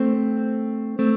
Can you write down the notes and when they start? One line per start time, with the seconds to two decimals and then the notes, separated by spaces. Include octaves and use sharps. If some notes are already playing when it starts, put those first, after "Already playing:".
Already playing: A3 C4
0.99 A3 C4